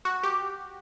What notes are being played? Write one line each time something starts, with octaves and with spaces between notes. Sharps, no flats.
F#4
G4